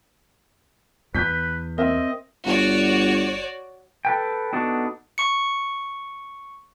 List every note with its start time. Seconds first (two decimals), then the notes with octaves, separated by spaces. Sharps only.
1.15 E2 B4 G6 B6
1.78 C4 A#4 D#5 E5
2.45 G1 F#4 C#5 D5
4.05 A4 B4 G5
4.53 B3 D4 D#4 F#4 A4
5.18 C#6 C#7